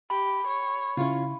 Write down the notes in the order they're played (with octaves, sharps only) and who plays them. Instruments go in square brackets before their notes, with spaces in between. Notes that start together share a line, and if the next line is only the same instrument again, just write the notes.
[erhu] G4 [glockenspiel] B5
[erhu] C#5
[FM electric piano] C#3 E4 [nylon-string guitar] C#4 F4